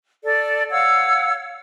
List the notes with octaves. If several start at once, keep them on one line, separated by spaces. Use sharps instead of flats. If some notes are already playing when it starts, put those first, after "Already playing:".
A4 D5
C#5 F5 F#5 E6